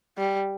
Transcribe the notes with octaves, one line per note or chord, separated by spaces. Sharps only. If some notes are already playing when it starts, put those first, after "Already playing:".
G3